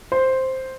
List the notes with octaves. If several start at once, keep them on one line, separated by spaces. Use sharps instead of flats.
C5